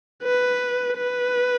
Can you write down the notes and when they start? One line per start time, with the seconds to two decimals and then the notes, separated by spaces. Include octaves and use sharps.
0.23 B4
0.97 B4